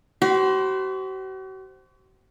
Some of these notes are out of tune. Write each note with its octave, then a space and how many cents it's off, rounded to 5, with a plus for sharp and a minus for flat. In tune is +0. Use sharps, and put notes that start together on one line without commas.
F#4 +45 C5 +0 B5 +0